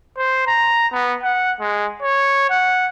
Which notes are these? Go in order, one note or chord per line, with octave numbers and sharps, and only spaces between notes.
C5
A#5
B3
F#5
G#3
C#5
F#5